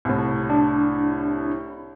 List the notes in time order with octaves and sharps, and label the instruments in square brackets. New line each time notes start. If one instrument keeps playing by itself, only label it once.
[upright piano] C2 A2
[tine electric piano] D4